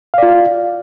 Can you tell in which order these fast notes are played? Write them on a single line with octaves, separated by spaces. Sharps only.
F5 D5 F4